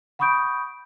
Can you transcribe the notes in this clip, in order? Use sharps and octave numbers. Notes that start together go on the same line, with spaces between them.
F#5 B5 C#6 D#6 G6 D7